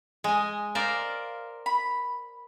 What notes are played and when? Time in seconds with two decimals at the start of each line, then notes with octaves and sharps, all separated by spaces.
0.24 G#3 D#5 G#5
0.75 A#4 C5 D5 F5
1.66 B5